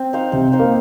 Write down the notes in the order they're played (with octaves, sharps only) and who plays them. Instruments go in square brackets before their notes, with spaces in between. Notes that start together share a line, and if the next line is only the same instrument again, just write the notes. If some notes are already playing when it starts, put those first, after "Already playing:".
Already playing: [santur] C4
D#4 C5 F5
[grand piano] C3 [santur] C4
[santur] D#4 C5 F5
[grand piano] A#3